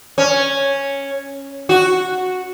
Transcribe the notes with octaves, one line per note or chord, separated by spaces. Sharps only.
C#4
F#4